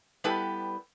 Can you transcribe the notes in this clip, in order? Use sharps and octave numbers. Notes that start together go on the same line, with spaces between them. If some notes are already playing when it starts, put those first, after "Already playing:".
G3 B3 E4 G4 A4 B4